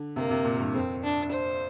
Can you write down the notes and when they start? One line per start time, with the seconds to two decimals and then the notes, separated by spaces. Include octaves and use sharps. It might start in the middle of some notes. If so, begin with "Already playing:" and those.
Already playing: D3
0.16 C3 A#3
0.30 C3
0.45 A#2
0.59 G2
0.74 F2 C4
1.03 D4
1.31 C5